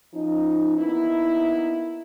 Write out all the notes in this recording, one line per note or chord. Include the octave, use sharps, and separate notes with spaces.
F3 C#4 D#4
A#3 B3 D#4 E4